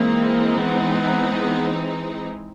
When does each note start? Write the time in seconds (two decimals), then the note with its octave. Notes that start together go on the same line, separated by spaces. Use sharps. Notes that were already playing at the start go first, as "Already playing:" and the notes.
Already playing: E3 G#3 A#3 C4 D#4
0.58 B3
0.95 B3
1.34 B3